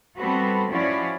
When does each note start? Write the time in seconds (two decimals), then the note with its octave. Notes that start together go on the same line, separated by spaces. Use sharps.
0.18 G3 B3 C4 F#4 A4 B4
0.69 F3 C#4 E4 F#4 C#5 D5